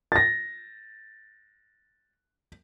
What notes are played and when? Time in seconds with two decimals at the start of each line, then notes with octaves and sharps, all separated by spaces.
0.12 A6 A#6